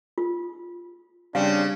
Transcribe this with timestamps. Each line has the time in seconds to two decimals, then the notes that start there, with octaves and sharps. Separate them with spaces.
0.18 F4
1.35 C#3 G3 C4 D4 F5